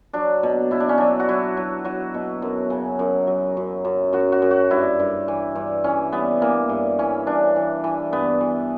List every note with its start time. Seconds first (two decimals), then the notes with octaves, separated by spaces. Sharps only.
0.13 F#3 D4
0.43 B2
0.71 B2 E4
0.80 D4
0.89 C#4
0.98 F#3 D4
1.20 F#4
1.29 F#3 E4
1.57 F#3
1.85 F#3 F#4
2.14 B2
2.42 F#2
2.70 C#3
2.99 F#2
3.27 F#3
3.57 F#2
3.85 F#2
4.13 F#2 F#4
4.32 F#4
4.42 F#2
4.51 F#4
4.71 G2 E4
4.99 G2
5.28 E3
5.55 G2
5.84 E3 C#4
6.12 G2 B3
6.42 E3 A#3
6.69 G2
6.99 E3 C#4
7.27 G2 D4
7.56 E3
7.84 E3
8.13 G2 B3
8.41 E3